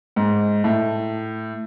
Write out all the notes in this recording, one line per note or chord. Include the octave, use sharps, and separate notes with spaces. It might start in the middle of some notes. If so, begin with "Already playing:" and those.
G#2
A2